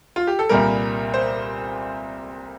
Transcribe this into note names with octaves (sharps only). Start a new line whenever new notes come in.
F4
G4
A4
C2 A#2 G3 A#4
C5